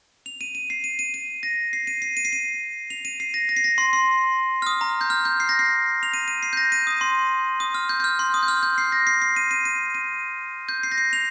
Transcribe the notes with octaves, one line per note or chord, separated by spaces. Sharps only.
F7
D#7
D#7
C7
D#7
D#7
D#7
A#6
C7
D#7
C7
D#7
C7
D#7
F7
D#7
C7
A#6
A#6
C7
A#6
C6
C6
F6
D#6
A#5
G6
F6
G6
C7
A#6
C7
F7
D#7
D#7
C7
G6
A#6
D#7
D#6
C6
D#6
F6
G6
G6
F6
C6
D#6
G6
F6
G6
C7
A#6
C7
C7
D#7
D#7
D#7
D#7
G6
C7
A#6
C7
F7